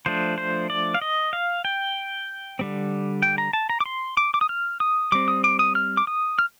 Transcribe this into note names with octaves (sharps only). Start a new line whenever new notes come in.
F3 A3 D4 C5
C5
D5
F5
D#5
F5
G5
D3 G3 C4
G5
A#5
A5
A#5
D6
C6
D6
D6
D#6
F6
D#6
G3 C4 D6
D#6
D6
D#6
F6
D6
D#6
F6